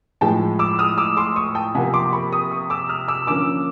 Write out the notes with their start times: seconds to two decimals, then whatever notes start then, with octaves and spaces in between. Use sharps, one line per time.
0.21 A2 F3 G#3 G5 A5
0.59 D6 E6
0.79 D#6 F6
0.98 D6 E6
1.17 C6 D6
1.36 C#6 D#6
1.55 G5 A5
1.75 C3 F3 A#3 F#5 G#5
1.94 C6 D6
2.13 B5 C#6
2.32 C#6 D#6
2.51 C#6 D#6
2.70 D6 E6
2.89 D#6 F6
3.08 D6 E6
3.27 D3 F3 A#3 C#4 D6 E6